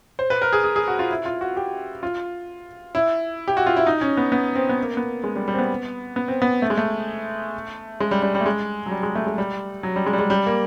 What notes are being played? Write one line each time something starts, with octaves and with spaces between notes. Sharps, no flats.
C5
B4
A#4
G#4
G#4
G#4
F#4
F4
E4
F4
F#4
G4
F4
E4
G4
F#4
F4
E4
D#4
C#4
B3
B3
C4
B3
A#3
B3
G#3
G3
G3
C4
B3
B3
C4
B3
A3
G#3
A3
G#3
G3
G3
G3
A3
G#3
F#3
G3
G#3
A3
G#3
G3
F#3
G3
G#3
G3
G#3
G3
A#3